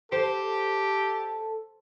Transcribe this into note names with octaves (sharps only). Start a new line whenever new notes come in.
G4 A4 C5